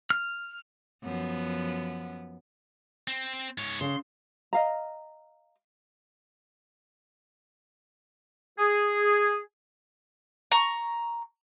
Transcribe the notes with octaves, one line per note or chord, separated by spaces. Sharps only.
F6
F#2 F3 B3
C4
G#2 C#5
C#3 C6
D#5 F5 A#5
G#4
A#5 C#6